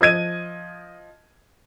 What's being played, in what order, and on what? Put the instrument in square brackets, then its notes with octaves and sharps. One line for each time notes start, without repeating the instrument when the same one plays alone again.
[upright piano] F3 D#5 G#6 D#7